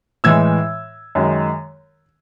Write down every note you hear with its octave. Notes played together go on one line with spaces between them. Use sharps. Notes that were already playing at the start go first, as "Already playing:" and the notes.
A2 E3 G#3 E6 G#6
F#2 D#3 G#3